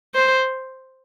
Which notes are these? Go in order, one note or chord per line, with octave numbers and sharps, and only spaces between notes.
C5